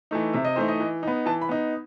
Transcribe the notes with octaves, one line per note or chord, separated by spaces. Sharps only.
E3 A3 D#4
C3 E5
D#5
E3 A3 D#4 C5
D#5
E3
B3 D#4
E3 A5
B5
B3 D#4